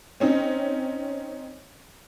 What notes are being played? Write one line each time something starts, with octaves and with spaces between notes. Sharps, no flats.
C4 C#4 D#4